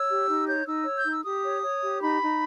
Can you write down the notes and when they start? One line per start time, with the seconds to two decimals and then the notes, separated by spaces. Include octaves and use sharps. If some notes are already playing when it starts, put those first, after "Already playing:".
Already playing: C#5 E6
0.09 G4
0.28 D#4
0.47 C#5 G6
0.66 D#4 E6
0.85 C#5
0.98 G6
1.05 D#4
1.12 E6
1.24 G4 D#6
1.45 C#5
1.63 C#5
1.82 G4
2.01 D#4 B5
2.22 D#4